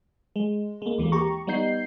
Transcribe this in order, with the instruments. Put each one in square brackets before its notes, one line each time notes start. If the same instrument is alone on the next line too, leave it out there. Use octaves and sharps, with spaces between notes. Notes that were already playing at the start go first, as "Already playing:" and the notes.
[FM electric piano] G#3
G#3 A#3
D#2 E3 G#3 A#3
G4 A#5 C#6
G3 B3 D#4 G6 C7